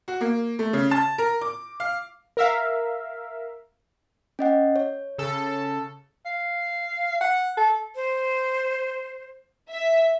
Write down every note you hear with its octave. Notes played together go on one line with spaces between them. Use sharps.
F#4
A#3
A3
C#3
A5
A#4
D6
F5
A#4 E5 F5
C#4 D#5 F#5
C#5
C#3 A4
F5
F#5
A4
C5
E5